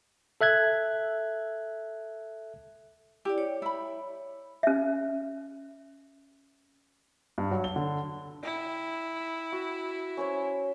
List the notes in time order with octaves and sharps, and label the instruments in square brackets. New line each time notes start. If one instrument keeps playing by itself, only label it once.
[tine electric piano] A4 E5 F#6 G#6
[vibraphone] E4 D5 [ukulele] G4
[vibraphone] C#5
[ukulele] E4 B5
[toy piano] C#4 E5
[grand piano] G2
F#3
G7
D3
[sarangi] E4 [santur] G5
[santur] F#4
C#4 C5 C#5